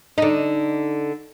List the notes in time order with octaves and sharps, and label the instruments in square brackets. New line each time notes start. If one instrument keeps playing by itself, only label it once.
[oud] D3 D#4